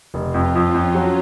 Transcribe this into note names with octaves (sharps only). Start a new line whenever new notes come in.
F1
F4
F2
F2 C#4
F2
F#3